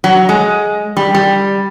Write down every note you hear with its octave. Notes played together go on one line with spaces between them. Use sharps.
F#3
G#3
G3
G3